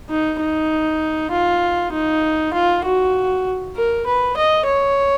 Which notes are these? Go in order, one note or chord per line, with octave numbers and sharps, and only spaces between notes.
D#4
D#4
F4
D#4
F4
F#4
A#4
B4
D#5
C#5